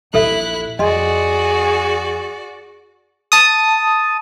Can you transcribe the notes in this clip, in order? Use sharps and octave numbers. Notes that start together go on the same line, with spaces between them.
A#1 E2 E4 G4 A4 E5 F#6
F2 F#4 G#4 D5 D#5 C6
A5 D#6